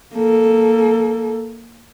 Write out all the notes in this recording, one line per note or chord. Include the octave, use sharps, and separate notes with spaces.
A#3 A4